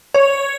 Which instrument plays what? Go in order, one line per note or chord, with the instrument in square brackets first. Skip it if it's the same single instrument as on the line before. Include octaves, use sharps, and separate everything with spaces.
[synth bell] C#5